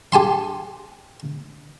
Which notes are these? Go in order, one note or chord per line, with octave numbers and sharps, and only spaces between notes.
G4 G#5 A5 C6